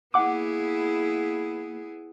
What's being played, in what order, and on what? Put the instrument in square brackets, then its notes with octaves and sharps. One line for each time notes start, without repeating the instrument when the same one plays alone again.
[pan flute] A#3 [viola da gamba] B3 E4 G#4 [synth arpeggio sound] F#5 D6